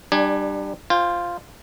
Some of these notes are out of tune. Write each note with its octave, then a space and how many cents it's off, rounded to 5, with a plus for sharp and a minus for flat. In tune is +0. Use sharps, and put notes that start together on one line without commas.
G3 +0 D4 +25 G#5 +0
F4 +0 C5 +0 G5 +35